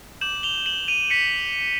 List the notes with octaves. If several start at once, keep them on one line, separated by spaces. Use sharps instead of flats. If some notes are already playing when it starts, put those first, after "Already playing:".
D6 G6 E7 F#7
F7 G7
E7 F#7
D#7 F7
B6 C#7